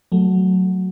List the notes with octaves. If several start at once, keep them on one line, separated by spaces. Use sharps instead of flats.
F#3 A3